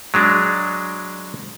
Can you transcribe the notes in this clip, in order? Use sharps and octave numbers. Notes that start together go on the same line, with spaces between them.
F#3 G#3 D4